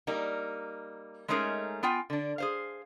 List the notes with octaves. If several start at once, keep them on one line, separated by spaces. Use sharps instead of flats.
G3 A#3 D#4
G#3 A3 C#4 D#4 G#4 A#4
B3 F4 G5 G#5
D3 D4
G#4 C5 F5